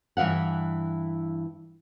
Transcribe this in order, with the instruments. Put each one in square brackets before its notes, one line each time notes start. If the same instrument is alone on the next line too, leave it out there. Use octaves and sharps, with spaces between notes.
[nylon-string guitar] G2 E3 E4 F5 F#5